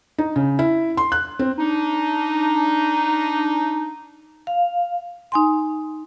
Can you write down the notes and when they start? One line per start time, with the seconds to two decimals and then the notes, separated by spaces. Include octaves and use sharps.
0.18 D#4
0.36 C#3
0.59 E4
0.97 C6
1.12 F#6
1.39 C4
1.58 D4 D#4
4.47 F5
5.32 D#4 G#5 C6